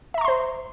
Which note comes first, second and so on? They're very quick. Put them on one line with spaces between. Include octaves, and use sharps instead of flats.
E5 A#5 C#6 C6 C5